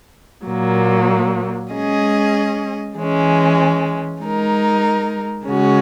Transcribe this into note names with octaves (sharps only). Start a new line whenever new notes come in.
A#2 F#3 A#3
G#3 C#4 G#4 D#5
E3 G#3 C#4
G#3 D#4 A#4
C#3 G#3 C#4 F#4